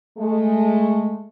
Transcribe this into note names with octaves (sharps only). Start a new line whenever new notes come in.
G#3 A3